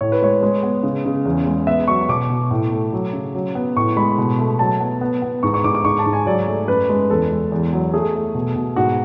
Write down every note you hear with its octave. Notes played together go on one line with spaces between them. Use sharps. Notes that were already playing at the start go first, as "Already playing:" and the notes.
A2 C#5
B4
G#3 C#5
G#3
B3
C#3
C#3
E2
G#3
B3 E5
F#3 C#6
B2 D6
B2
A2
A3
F#3
C#3
F#3
B3
A2 C#6
G#3 B5
B2
A3
F#3 A5
B3
B3
B3
G#2 C#6
C#6
G#2 D6
D6
G#2 C#6
A5
G#2
G#5
F#3 D5
A3
F#2 B4
G#3
E2 A4
G#3
E2
F#3
A3 G#4
A3
B2
B2
G#2 F#4